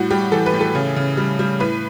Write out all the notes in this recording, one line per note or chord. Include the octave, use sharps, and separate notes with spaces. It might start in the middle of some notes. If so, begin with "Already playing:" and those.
Already playing: A2 G3 F#4
G3 G4
E3 A4
B4
A2
A4
C#3
C#3
G3
G3
A2 B4